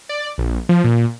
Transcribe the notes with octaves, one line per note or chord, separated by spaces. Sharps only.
D5
A#1
F3
A#2